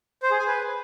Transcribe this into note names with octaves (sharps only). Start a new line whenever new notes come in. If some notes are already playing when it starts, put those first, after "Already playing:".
C5
G#4
G#5
B4